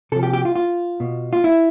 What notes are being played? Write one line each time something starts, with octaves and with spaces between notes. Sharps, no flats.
C3 F3 A4
G4
G4
F4
F4
B2
F4
E4